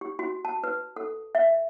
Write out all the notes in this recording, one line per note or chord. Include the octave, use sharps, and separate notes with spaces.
G4
F#4
A5
B4
A4
E5